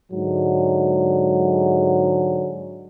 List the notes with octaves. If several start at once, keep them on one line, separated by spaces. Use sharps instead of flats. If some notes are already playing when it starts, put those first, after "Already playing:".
G#2 D3 F#3 G#3